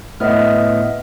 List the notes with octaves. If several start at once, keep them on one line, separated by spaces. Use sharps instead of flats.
A2 B3 D#5 E5 F6